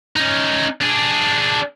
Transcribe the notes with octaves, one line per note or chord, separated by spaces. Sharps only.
C#4 D#4
D4 G#4